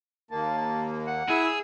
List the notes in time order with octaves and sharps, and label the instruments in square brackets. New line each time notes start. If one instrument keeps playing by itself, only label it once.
[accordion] D#2 A#3 [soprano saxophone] A5
[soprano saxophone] F#5
[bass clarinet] E4 [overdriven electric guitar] G#4 [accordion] E6